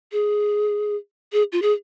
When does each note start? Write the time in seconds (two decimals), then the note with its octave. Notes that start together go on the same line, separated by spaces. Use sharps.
0.12 G#4
1.33 G#4
1.52 F4
1.62 G#4